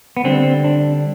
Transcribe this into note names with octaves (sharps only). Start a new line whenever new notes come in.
B3
D3 G3 C4
D4